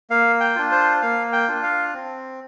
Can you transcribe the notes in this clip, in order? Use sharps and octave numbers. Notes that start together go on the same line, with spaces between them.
A#3 F5
G5
D4 F4
C5
A#3 F5
G5
D4 F4
F5
C4